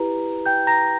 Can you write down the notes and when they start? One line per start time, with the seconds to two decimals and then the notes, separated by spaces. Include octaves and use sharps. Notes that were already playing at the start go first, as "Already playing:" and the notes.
Already playing: E4 G4 B4 A#5
0.46 G5 G6
0.67 A#5 A#6